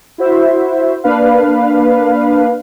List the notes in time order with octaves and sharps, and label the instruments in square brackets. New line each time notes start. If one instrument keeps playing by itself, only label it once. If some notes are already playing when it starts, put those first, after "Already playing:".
[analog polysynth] E4 F#4 C5 E5
A#3 D4 B4 F5